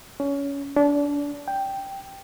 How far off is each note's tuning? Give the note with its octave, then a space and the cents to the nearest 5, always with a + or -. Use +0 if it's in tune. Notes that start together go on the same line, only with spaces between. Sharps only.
C#4 +20
D4 -30
G5 +0